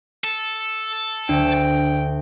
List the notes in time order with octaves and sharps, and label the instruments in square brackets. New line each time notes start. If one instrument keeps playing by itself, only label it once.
[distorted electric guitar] A4
[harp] D2 [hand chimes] D4 [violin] G5